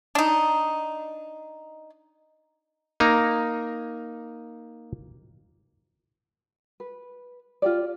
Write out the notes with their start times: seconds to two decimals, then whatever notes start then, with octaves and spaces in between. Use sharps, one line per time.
0.15 D4 D#4
3.00 A#3 D#4 A#5
6.80 B4
7.62 F4 G4 D5